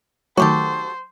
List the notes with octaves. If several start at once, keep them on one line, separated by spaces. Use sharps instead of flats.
D#3 F#3 A3 F#4 G4 A4 C5